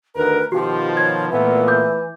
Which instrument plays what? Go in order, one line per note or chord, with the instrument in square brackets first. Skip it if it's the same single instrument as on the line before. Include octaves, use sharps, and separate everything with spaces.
[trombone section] D2 D#3 A#4 [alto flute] B4
[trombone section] B2 D#3 F3 [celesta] F#4 [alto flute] G4
[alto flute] C#5 [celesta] G#6
[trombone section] A#2 B3 [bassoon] E3 [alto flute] A3
[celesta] D6 G6